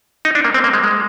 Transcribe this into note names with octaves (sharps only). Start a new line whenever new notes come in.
D#4
D4
A#3
C4
A#3
G#3
G#3